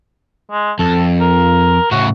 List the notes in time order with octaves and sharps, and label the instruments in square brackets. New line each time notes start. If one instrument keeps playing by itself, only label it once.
[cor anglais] G#3
[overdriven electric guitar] F2 [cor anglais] A4
[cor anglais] A#4
[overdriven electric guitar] A2 C#3 [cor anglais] F#4